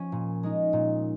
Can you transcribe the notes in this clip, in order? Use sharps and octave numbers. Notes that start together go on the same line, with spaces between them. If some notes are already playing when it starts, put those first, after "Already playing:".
Already playing: F3 C#4
A#2
G#3 D#4
A#2